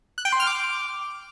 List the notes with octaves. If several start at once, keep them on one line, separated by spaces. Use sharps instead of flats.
F#6
G5
C6
F6
D6